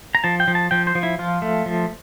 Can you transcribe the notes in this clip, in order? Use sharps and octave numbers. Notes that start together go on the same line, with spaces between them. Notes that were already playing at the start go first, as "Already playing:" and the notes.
A#5
F3 A5
G5
F3
A5
F3 G5
C5
F3
E4
F3 F4
A3
F3